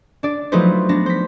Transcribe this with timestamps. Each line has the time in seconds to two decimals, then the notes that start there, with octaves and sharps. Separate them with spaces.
0.23 D4 D5
0.52 F3 F#3 A3 D#4 B4 C5
0.89 B3 D4 A#6
1.06 C5 B6